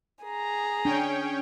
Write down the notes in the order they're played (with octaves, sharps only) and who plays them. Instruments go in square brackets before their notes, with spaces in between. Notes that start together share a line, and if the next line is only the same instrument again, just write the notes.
[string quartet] G#4 [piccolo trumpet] A#5
[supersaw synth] C#4 C#5 G5 [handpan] D4